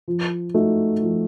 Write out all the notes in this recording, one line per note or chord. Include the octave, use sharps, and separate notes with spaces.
F3
A3 D#4 F#4
F3